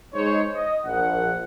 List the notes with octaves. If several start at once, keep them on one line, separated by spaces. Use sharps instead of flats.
G#3 D#4 C5 C#5
D#5
A#1 F#5